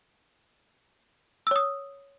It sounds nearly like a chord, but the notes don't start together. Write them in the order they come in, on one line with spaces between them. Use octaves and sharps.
E6 C#5 D#6